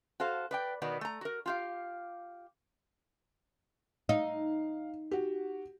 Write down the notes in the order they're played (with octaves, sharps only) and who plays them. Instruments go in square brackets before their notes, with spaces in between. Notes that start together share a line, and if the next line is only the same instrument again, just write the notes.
[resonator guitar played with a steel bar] F#4 A4 C5 F5
B4 D5 G5
B2 D#3 B3 D5
A3 A#5
F#4 A#4
F4 G4 F5
[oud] D#4 [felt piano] F5
[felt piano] F#4 G4